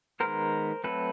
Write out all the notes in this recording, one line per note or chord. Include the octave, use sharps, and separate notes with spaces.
D#3 G#3 B3 A#4 C5
F#3 A3 C4 A4 B4